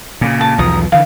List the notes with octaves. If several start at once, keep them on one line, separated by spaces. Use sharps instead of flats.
A#2 C#3
A5
B1 E2 F3 A#5 D#6
D3 E3 F5